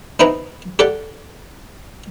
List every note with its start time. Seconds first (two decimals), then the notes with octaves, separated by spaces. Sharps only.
0.20 B3 C4 D#4 E4 G5 A#5
0.79 G4 A4 D5 F#5 G5